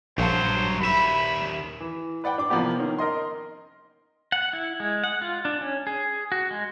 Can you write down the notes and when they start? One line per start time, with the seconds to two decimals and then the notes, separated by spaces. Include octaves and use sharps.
0.18 A#1 G2 F#3 C5 F5 A5
0.81 D#2 E5 B5
1.80 E3
2.24 B4 D5 F#5 G5
2.38 D4 D6
2.50 C3 E3 F3 A#3 B3 G4
2.80 D#3 C#4
2.98 A#4 D#5 C6
4.32 F#5
4.53 E4
4.80 G#3
5.04 F#5
5.22 F4
5.45 D4
5.61 C#4
5.87 G#4
6.32 F#4
6.51 G#3